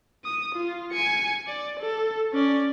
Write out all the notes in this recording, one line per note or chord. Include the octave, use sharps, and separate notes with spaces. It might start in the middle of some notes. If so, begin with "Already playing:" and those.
D#6
F4
G#5 C#7
D5
A4
C#4 D5